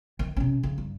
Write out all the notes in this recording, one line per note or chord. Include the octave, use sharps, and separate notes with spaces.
D#3
C3 C#4
C#3
G2